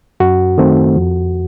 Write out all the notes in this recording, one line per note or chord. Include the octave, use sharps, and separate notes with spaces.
F#2 F#4
D#3 A3 C4
F2